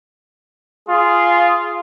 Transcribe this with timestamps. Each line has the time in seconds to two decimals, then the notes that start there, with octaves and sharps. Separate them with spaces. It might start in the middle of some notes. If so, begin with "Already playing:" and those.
0.89 F4 G#4